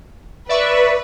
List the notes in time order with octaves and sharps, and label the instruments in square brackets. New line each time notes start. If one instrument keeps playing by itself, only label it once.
[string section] B4 [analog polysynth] D5 E5 C#6